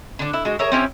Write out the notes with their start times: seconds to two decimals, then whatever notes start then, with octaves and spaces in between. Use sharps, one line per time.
0.19 D3 D4
0.33 E4
0.45 G#3 F#4
0.59 G#4 A#4 C#5 E5
0.72 C4 C#4 E4 G4